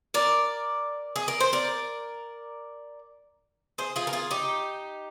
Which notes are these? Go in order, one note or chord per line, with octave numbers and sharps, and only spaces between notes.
A#4 D5
G#4
A#4
C5
A#4 D5
G#4 C5
F4 G#4
A#4
F4 G#4
D#4 G4